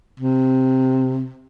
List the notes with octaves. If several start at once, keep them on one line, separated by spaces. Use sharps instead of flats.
C3